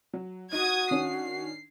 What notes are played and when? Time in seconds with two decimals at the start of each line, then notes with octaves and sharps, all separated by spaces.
0.14 F#3
0.53 D#4 F#4 D#6 G#6
0.91 D#3 C#4 D4 C7